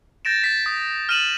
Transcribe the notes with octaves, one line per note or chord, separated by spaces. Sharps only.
G6 A6 A#6 D7 E7
A6 B6 E7
D#6
F6 A6 D#7 E7 F#7